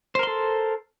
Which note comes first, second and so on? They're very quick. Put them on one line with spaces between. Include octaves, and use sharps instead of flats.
C5 A#4 C6 A4